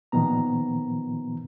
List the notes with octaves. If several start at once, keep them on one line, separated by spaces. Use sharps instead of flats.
A#2 D#3 F3 B3 A#5